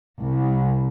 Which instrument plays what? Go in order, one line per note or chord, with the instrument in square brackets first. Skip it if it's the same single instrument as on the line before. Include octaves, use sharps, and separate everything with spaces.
[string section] C2